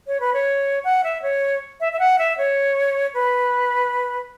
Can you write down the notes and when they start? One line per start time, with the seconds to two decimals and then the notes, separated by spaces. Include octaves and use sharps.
0.07 C#5
0.20 B4
0.34 C#5
0.84 F#5
1.04 E5
1.22 C#5
1.80 E5
1.93 E5
1.99 F#5
2.19 E5
2.38 C#5
3.14 B4